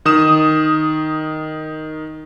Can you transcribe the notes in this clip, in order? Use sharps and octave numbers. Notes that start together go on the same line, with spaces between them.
D#3 D#6 E7